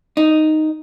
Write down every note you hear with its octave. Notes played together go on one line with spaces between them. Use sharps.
D#4